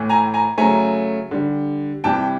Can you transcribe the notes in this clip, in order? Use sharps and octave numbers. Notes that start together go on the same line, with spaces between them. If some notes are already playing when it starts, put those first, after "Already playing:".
Already playing: A2 E3 A3
G#5 A#5
G#5 A#5
C#3 F#3 A3 G#5 A#5
D3 G3
C3 E3 G3 G5 A5